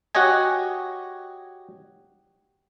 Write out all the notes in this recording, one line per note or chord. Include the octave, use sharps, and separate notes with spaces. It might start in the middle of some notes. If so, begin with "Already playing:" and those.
F#4 G4 C#5 D#5 G#5